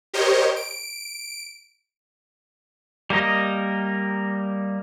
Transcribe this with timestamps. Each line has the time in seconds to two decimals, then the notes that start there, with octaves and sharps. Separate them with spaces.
0.13 G4 A#4 C5 C#5 D#5
0.56 D7
3.10 G3 A#3 A#4 D#5